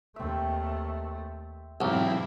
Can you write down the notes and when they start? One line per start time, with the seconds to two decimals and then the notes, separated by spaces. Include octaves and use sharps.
0.16 D#2 A3 C4 E5
1.81 B1 G#2 E3 C4 E4 G4 A#4 E5